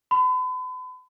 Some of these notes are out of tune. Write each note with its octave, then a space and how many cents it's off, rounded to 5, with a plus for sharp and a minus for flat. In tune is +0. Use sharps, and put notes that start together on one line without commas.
B5 +40